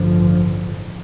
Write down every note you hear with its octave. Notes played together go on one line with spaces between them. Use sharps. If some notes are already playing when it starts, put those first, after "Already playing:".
Already playing: A1 G2 D3 F3